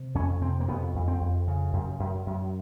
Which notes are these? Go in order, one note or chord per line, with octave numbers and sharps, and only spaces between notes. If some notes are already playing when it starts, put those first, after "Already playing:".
Already playing: C3
F2 C#4
C3 C4
A#3
F2 B3
F2
C4
F2
C#3
F#2
F#2
F#2